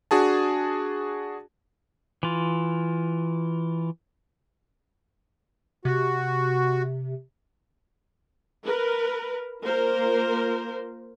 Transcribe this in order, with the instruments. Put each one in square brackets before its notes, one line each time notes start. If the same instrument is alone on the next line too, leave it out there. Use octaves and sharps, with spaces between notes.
[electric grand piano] D4 F#4 G#4 A5
[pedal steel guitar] E3 F4
[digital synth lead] C3 [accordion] F#4
[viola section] A#4 B4
A#3 F4 A#4 C5